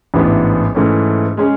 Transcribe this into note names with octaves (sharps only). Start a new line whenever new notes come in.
A1 G#2 E3 B3 D4
G#2 E3 A3 C#4
G#3 C#4 G#4